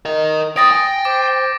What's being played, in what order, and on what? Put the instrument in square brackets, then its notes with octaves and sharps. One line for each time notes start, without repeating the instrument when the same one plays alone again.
[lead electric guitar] A#4 D#5
[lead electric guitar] C#5 G5 [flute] D#6 [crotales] A6 A#6 D7
[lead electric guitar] G5 [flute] G#5
[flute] C5 [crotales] D6